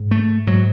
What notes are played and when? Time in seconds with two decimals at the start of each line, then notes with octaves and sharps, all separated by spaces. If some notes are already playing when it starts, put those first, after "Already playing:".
Already playing: G#2
0.11 A3
0.47 G#2 F#3